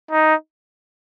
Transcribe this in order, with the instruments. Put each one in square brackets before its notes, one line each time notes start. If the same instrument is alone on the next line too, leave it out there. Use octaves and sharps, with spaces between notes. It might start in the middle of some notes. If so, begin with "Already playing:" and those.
[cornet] D#4